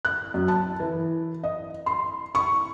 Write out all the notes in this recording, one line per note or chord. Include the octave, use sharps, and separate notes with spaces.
F#6
F#2
A5
E3
D#5
C6
C#6